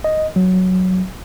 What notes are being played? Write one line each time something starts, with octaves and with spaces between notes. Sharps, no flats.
D#5
F#3